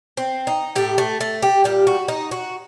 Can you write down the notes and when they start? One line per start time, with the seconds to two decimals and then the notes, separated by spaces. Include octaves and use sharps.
0.17 C4
0.47 D#4
0.75 A2 A3 G4
0.98 A3
1.21 A3
1.42 G4
1.64 A#2 G3 G4
1.87 F#4
2.08 D#4
2.31 F#4